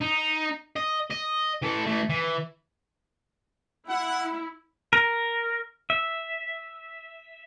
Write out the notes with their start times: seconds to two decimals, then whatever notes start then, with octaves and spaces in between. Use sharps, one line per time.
0.01 D#4
0.76 D#5
1.10 D#5
1.62 E3 A4
1.86 E3 A3
2.09 E3
3.89 E4 F#5
4.93 A#4
5.90 E5